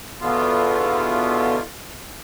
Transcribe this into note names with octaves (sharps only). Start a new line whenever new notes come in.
E2 B2 D3 B3 F4